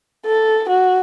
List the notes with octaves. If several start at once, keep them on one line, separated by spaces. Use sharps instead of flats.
A4
F#4